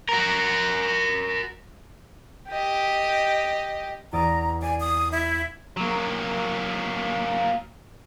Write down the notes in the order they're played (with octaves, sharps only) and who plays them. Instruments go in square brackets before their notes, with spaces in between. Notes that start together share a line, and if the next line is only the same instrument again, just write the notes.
[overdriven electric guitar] F#4 A#4
[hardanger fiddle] G4 D#5
[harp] E2 D5 D#6 [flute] A#5
[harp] D5 [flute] G#5
[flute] D#6
E4
[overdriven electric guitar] F#3 A#3